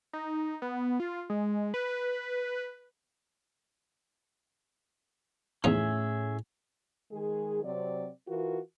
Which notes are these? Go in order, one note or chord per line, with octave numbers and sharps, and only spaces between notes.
D#4
B3
F4
G#3
B4
E2 A2 C#4 D#4 G#4 E5
D#3 G#3 G#4
C3 F#3 C4 D5
E3 F4 F#4 A#4